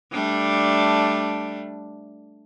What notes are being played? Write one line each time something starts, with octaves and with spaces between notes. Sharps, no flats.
G3 A3 D4